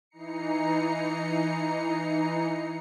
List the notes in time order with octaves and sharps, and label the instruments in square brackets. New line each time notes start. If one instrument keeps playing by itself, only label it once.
[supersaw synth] E3 D#4 A#5 C7 C#7